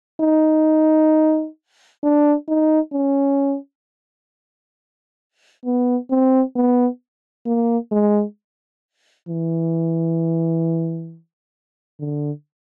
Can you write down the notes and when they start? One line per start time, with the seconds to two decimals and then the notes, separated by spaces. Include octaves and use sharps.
0.21 D#4
2.03 D4
2.48 D#4
2.93 C#4
5.65 B3
6.10 C4
6.56 B3
7.46 A#3
7.92 G#3
9.28 E3
12.00 D3